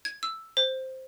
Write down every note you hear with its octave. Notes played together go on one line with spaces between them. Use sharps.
G#6
E6
C5